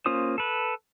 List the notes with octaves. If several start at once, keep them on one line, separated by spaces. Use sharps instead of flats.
A#3 C#4 F4 C5 D#6
A4 B4